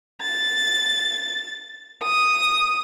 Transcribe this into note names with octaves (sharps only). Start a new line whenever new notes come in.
A6
D#6